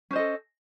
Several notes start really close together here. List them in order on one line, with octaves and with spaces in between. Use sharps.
C#4 C5 D#5 A4